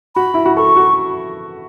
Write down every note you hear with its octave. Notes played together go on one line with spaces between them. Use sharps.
F#4 B5
E4
F#4
A4 C#6
F#4